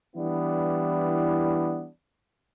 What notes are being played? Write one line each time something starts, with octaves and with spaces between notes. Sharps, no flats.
E3 G3 B3 D4 E4